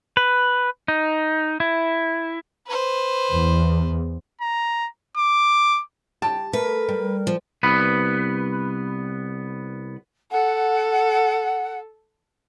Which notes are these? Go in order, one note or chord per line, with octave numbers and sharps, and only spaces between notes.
B4
D#4
E4
B4 C5
E2
A#5
D6
G4 A5
A3 A#4 B4
G3
F3
C2 B3 B4
A4 F#5